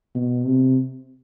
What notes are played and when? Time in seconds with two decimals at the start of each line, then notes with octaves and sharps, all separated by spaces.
0.15 B2
0.45 C3